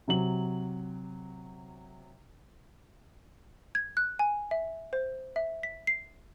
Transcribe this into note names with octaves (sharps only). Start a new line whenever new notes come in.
C3 F#3 F#7
G#6
F#6
G#5
E5
C5
E5
B6
C7